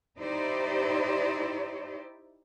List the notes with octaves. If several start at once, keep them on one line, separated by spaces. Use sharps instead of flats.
D#4 E4 G4 C5 D5